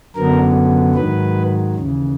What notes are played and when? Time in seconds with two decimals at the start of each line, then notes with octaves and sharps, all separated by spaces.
0.15 F#2 D3 F#3 B3 A#4
0.95 G#2 D#3 F#3 B4
1.75 D#2 C#3 E3